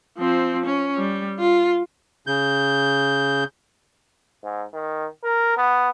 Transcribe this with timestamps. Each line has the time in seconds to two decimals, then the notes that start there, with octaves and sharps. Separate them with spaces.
0.18 F3 C4
0.65 C#4
0.97 G3
1.38 F4
2.27 C#3 G6
4.44 G#2
4.74 D#3
5.24 A#4
5.57 B3